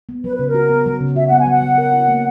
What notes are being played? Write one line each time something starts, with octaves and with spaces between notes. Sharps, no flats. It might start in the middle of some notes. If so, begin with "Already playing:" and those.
B3
F#3 B4
C#3 B4
A#4
F#4
B3
F#3
C#3
F#4 E5
F#5
B3
G#5
F#3 F#5
F#3
A#4
E4
A#3